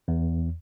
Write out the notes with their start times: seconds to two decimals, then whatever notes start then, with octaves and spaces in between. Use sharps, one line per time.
0.08 E2